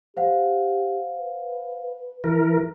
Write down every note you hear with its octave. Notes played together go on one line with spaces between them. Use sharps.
G4 C5 F5 F#5
B4
E3 A#4